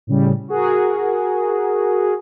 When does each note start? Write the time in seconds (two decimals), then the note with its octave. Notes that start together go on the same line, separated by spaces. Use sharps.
0.07 A2 C#3 G3
0.48 F#4 G#4 A#4